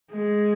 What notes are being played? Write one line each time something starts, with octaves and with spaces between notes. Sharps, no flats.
G#3